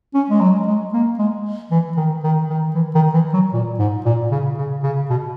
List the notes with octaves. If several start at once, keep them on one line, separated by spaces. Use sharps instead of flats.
C#4
G#3
F#3
G#3
A#3
G#3
E3
D#3
D#3
D#3
E3
D#3
E3
F#3
A#2
G#2
A#2
C#3
C#3
C#3
B2